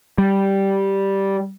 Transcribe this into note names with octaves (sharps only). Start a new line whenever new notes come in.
G3